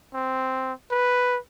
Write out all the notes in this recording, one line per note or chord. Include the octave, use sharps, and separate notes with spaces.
C4
B4